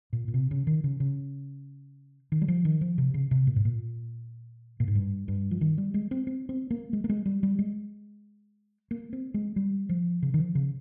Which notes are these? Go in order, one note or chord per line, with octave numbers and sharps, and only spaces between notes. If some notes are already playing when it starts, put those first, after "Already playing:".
A#2
A#2
C3
C#3
D#3
C#3
C#3
D#3
G3
F3
D#3
F3
C3
C#3
C3
A#2
G#2
A#2
A#2
G#2
G2
G2
F3
D#3
G3
G#3
C4
C4
C4
A#3
G#3
A#3
G#3
G3
G3
G#3
A#3
C4
G#3
G3
F3
C#3
D#3
F3
C#3